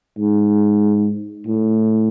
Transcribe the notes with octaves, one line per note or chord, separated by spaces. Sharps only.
G#2
A2